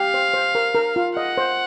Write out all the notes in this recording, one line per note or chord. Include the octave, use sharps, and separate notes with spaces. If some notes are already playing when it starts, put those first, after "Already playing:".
Already playing: G4 F5
C5
C5
A#4
A#4
F4
D#5 F#5
C5